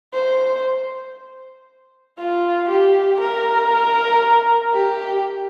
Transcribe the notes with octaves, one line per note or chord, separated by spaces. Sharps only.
C5
F4
G4
A#4
G4